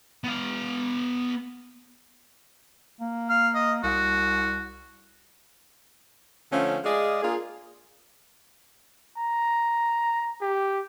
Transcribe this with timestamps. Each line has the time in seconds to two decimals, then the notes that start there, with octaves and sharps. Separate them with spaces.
0.24 B3 F5
3.00 A#3
3.29 F5
3.55 D#5
3.83 C2 F#4
6.51 D3 F3 A3 C#4
6.84 G#3 G#4 D5 D#5 F5
7.22 A#3 D4 F4 G#4
9.17 A#5
10.41 G4